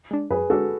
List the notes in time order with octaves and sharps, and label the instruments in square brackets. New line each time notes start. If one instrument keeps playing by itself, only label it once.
[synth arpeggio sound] G#3 D4
[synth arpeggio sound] F#2 [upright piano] G#4 B4
[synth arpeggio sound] D3 G#3 D4 [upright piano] F#4 A4